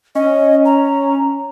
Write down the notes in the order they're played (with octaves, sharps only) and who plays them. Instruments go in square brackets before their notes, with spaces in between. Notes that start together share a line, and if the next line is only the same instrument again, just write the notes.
[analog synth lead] C#4 [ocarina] D#5
[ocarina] A#5